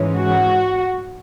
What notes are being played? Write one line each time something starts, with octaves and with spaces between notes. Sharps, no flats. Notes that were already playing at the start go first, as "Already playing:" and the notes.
Already playing: G#2 E3 G#3 C#4
F#4